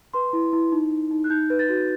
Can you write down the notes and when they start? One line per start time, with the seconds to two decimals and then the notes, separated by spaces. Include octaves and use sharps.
0.14 B4 C6
0.33 E4
0.53 E4
0.72 D#4
0.91 D#4
1.11 D#4
1.24 F#6
1.30 D#4 G6
1.50 B4
1.59 A6
1.69 F#4